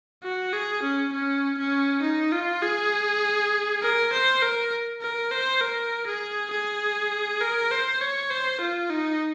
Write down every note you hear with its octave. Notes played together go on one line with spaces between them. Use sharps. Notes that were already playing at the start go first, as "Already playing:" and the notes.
F#4
G#4
C#4
C#4
C#4
D#4
F4
G#4
A#4
C5
A#4
A#4
C5
A#4
G#4
G#4
A#4
C5
C#5
C5
F4
D#4